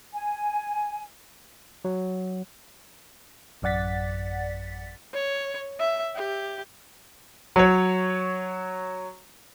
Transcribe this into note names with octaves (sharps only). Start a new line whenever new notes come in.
G#5
F#3
A1 F#2 D5 F#5 A6 B6
C#5
E5
G4
F#3 C#5